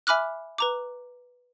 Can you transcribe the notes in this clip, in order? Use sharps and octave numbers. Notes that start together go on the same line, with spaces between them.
E5 G#5 B5 D6 F6 F#6
B4 A#5 D6